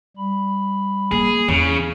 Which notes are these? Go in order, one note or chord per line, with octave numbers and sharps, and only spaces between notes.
G3 B5
A#3 G#4
E2 C#3